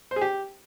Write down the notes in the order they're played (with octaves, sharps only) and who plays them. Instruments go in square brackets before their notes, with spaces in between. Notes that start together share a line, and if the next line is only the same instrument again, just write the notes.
[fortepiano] C5
G#4
G4